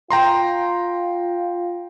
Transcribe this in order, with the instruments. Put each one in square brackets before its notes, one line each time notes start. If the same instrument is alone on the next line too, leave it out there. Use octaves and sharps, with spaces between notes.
[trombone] F4 [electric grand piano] G5 A#5 C6